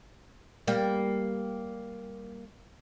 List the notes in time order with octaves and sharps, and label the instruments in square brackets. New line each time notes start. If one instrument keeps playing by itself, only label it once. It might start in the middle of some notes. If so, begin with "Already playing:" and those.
[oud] G3 A#3